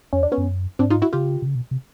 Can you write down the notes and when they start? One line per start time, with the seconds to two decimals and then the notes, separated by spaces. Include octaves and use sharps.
0.13 F2 C#4
0.21 E2 D4
0.32 B3 C#4
0.38 F#2
0.79 G#2 C4 D4
0.90 D#4 F4
1.02 E4 F#4
1.13 C#3 F4 G4
1.42 C3
1.46 C#3
1.55 B2
1.71 C3